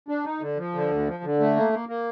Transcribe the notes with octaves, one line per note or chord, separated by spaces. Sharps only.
D4
D#4
D3
F3
D3
D2
F3
D3
A3
A#3
A#3
A#3